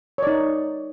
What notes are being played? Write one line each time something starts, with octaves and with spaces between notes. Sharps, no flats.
D#4 C#5 D5